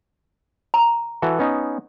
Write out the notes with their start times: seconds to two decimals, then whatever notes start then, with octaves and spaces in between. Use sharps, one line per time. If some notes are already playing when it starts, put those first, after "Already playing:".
0.74 A#5
1.22 E3 F#4 A4
1.39 B3 C#4 D#4